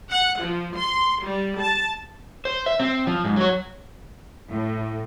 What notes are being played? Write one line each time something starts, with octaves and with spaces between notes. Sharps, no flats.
F#5
F3
C6
G3
A5
C5
E5
C4
F3
G#2
F#3 C#5
A2